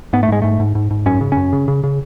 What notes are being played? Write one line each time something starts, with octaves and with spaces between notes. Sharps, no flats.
G#2 B3
A3
G#2 G#3
G#2 A3
G#2
G#2
G#2
F#2 C#4
C#3
F#2 C#4
C#3
C#3
C#3